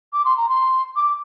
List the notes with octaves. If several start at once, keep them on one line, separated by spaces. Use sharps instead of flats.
D6
C6
A#5
C6
D6